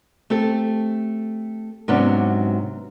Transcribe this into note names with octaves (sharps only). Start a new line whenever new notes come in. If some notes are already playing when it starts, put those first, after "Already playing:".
A3 C4 G4 A4
G#2 C3 F#3 B3 C#4 D4